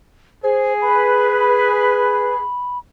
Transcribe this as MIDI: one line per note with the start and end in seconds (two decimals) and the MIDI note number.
0.43 2.41 68
0.43 0.73 72
0.82 2.40 71
0.82 2.78 83